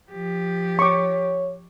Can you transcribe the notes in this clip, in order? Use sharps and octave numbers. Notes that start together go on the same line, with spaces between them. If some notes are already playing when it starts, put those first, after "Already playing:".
F3 G4
C#5 C#6 D6